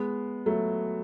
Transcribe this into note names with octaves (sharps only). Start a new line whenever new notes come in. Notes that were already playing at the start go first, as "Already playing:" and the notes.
Already playing: G#3 B3
F#3 A3